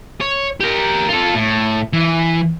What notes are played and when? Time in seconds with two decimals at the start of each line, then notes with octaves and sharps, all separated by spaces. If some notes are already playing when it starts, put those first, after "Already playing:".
0.21 C#5
0.60 G4 A#4
1.10 F4 A4
1.35 A2
1.93 E3